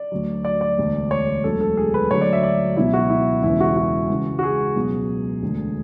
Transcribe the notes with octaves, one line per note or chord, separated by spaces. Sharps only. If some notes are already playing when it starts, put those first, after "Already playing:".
Already playing: D5
D2 D3 F#3
D5
D5
E1 D2 D3
C#5
E1 D2 D3 F#3 A4
A4
G#4
B4
D2 D3 F#3 C#5
D5
E5
D5
C#2 B2 F#3 E4
F#4
E4
E1 E2 C#3 E3 E4
F#4
F#4
C#2 C#3 E3
F#4
G#4
C#2 B2 F#3
E1 D2 D3